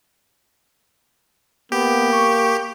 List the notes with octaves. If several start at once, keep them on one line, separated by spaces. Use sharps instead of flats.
A#3 B3 G4
C#6